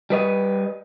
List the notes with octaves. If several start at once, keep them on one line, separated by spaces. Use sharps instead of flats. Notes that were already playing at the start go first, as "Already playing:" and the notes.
G3 B4 D#5